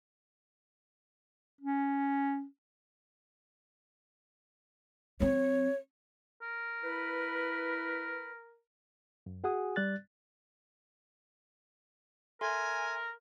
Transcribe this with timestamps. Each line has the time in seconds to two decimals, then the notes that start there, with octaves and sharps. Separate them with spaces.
1.61 C#4
5.20 F#3 C4 C#5
6.42 A#4
6.82 E4 B4
9.26 F#2
9.44 F#4 G#4 F#5 G#5 D#6
9.76 G3 D5 F#6 A6
12.41 A4 A#4 E5 G#5 C6